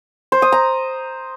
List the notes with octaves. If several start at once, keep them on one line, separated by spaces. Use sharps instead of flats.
C5
D#6
A#5